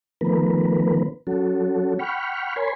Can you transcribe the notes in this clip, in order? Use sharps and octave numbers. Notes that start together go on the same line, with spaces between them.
D#3 F3 A3 B3 A#4 B4
F#3 C#4 F#4 A4
F#5 G5 B5 C#6 F6
A#4 C#5 G#5 B5 C6